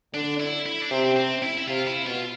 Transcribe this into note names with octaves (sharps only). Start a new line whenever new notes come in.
D3 D4
E4
E4
D4
C3 C4
C4
E4
E4
C3 F4
E4
B2 F4